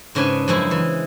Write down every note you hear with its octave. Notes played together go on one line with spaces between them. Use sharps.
G#2 C#3 D4 B4 G#5
F#2 C#3 F3 G#3 E4
E3